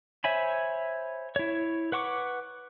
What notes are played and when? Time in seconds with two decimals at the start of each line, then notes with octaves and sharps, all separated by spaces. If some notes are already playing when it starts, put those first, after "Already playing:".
0.24 C5 C#5 E5 G#5 B5
1.36 E4 C#5
1.92 B4 F#5 C#6 D6